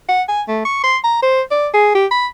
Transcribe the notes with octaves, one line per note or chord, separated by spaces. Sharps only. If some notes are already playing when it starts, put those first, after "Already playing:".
F#5
G#5
A3
C#6
C6
A#5
C5
D5
G#4
G4
B5